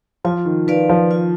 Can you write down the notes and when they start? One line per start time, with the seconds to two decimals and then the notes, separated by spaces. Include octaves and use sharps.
0.24 F3 F4
0.45 D#3
0.67 D#3 B4 D5 F5
0.89 F3
1.11 F4